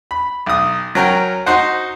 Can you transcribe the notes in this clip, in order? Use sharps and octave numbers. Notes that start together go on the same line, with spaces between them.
B5
B1 D#6
F#3 C#4 A#4 G5
D#4 F#4 C5 F#5